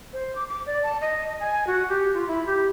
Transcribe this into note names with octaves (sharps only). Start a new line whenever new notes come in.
C5
D6
D6
D5
A5
D#5
G#5
F#4
G4
F4
E4
G4